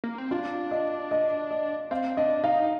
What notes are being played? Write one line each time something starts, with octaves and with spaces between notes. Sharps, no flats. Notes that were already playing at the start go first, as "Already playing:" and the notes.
A#3
C4
D4 F4
D#5
D#5
D#5
C4 F5
D4 D#5
D#4 F5